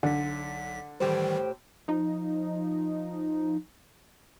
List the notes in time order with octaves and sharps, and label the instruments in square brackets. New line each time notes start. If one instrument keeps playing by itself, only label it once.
[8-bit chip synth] B1 B6 [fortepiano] D3
[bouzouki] A2 G4 C5 [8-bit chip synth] D#3 E3 G3
[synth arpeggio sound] F3 D#4